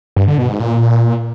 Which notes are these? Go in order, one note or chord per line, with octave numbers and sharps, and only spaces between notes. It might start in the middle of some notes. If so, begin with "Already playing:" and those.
G2
D3
B2
G#2
A#2